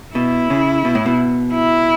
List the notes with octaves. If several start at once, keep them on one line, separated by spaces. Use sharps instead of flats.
B2 E4
C#3
B2
A2
B2
E4